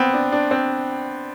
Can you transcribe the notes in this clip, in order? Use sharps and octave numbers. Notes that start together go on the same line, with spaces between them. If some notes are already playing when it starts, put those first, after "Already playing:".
Already playing: B3 C4
D4
D4
C4